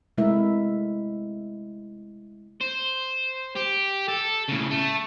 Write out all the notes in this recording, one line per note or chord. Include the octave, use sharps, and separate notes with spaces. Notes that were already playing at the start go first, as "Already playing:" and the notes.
C3 G#3 A3 E4 A#4 E5
C5
G4
A4
A2 C#3
A3